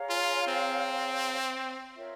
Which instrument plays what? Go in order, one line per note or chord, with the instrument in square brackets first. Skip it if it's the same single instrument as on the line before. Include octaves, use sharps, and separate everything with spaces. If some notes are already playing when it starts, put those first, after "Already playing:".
Already playing: [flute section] G#4 C#5 F5 A#5
[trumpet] F4
C4
[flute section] F4 A#4 C#5 E5